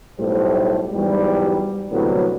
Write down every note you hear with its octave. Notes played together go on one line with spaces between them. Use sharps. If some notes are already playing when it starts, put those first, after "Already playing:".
B1 A2 G3 A3 C5
E2 G#2 F#3 G3
C2 A2 D3 F#3 G3 B3